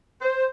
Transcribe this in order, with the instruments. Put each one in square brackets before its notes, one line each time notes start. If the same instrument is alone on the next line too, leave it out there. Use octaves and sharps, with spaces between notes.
[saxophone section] C5